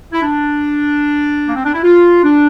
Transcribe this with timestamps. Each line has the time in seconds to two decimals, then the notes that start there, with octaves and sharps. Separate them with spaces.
0.13 E4
0.22 D4
1.47 A#3
1.56 C4
1.65 D4
1.74 E4
1.83 F4
2.23 D4